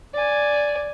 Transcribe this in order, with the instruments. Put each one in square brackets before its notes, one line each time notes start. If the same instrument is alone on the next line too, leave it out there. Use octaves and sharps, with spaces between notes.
[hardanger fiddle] D5 G#5